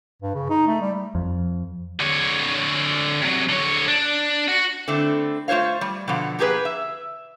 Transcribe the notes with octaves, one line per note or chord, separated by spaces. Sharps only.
G2
C#3
D#4
A3
G3
F2
D3 C#5
C3 F#3
D3 C#5
D4
F#4
D3 A3 C4 E4
A3 F4 C5 C#5 F5
G3
B2 D3 F3 F#5
A#3 G4 G#4 A#4 B4
E5